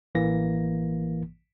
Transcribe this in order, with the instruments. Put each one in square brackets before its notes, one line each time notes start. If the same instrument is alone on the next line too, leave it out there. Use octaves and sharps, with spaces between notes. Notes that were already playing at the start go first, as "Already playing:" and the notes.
[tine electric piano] A1 E3 A#3 A#6